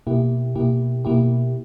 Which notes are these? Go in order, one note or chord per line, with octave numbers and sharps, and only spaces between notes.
B2 A#3 E4 G4
B2 A#3 E4 G4
B2 A#3 E4 G4